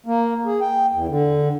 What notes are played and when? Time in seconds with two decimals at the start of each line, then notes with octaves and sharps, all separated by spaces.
0.06 A#3
0.45 G#4
0.61 G5
0.93 E2
1.08 D3